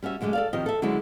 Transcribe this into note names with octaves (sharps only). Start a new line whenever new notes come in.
G3 C#4 F#4 E5
F#2 D3 G#3 A3 D4
A4 D5 F5
F2 D#3 G4 C5 D#5
A4 E5
D3 F#3 G#3 C#4 E4